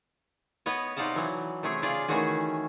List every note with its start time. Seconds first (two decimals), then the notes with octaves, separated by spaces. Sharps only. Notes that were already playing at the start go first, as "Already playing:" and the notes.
0.66 B3 B4 C#5 D#5
0.97 C3 D#4 D5 F5 F#5 A5
1.16 E3 F#3
1.63 C3 A3 C#4 G#4
1.82 C#3 F4 G#4 D5 F5
2.08 D#3 E3 A3 C#4 F#4 G#4